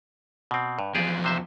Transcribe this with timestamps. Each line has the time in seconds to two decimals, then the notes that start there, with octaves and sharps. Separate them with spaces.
0.51 B2 C4
0.79 G2
0.95 E2 F3 G4 G#4 D5
1.24 C3 C5 E5